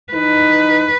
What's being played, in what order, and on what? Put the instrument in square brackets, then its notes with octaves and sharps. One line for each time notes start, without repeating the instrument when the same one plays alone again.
[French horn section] E3 D#4 [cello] B4